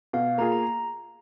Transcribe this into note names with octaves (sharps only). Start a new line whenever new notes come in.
B2 F5
A#3 F4 G#4 A#5
A#5